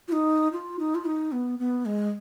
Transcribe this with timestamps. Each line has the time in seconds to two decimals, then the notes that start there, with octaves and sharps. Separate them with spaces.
0.08 F4
0.12 D#4
0.53 F4
0.79 D#4
0.95 F4
1.05 D#4
1.32 B3
1.59 B3
1.86 G#3